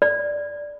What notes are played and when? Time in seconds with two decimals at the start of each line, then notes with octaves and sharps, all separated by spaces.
0.02 D5